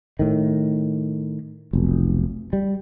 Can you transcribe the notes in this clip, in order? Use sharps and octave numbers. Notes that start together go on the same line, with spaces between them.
A2 D#3
F1 B1
G3